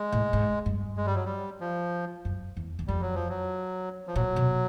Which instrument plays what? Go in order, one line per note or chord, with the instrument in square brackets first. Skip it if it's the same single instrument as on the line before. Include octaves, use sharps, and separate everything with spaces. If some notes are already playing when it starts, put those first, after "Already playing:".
Already playing: [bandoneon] G#3
[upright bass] A2
G#2
G2
[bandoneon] G#3
G3
F#3
G3
F3
[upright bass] F#2
E2
E2
[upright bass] F2 [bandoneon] G3
[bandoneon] F#3
F3
F#3
F3
[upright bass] A#2 [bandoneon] F#3
[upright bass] B2